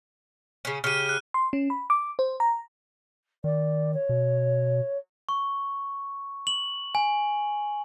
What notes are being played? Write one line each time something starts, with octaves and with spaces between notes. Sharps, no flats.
C#3 C#4
C#3 G4 F6 D#7
F6 F#6
C6
C#4
B5
D6
C5
A#5
D#3 D5
C#5
B2
C#6
F#7
G#5